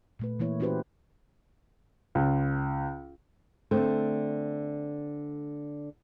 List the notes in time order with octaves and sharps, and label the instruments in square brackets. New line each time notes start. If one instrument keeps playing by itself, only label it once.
[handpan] A#2 A3 B4
E3 A#3 E4 C#5
C#4 E4 F#4 G4 B4 C5
[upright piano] C#2
[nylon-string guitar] D3 A3 C4